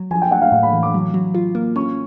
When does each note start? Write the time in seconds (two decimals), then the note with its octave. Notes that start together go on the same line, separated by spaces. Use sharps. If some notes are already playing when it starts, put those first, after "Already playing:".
Already playing: F#3
0.11 F3 G#5
0.22 G5
0.31 A3 F#5
0.42 F5
0.52 A2 F5
0.63 B5
0.73 E3
0.83 D6
0.94 F#3
1.14 F#3
1.35 F4
1.55 A#3
1.76 C#4 C#6